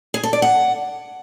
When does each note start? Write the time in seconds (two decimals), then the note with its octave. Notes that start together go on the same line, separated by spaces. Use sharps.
0.14 G#4
0.23 A4
0.33 D5
0.42 F#5